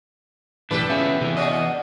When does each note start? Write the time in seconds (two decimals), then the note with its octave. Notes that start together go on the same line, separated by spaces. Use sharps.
0.71 B1 A2 E3 D4 G4 A4 B4
0.90 E2 C#4 F4 G#4 E5
1.21 C3 E3
1.37 C#4 D4 F#4 D#5